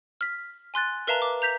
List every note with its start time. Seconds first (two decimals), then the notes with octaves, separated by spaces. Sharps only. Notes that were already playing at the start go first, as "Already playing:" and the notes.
0.21 F6 B6
0.74 G#5 C6 F#6 A6
1.07 A#4 B4 E5 F5 A5 A#5
1.22 D6
1.42 A#5 G6 B6 F7